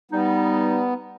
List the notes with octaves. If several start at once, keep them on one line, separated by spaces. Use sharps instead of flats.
G3 B3 D#4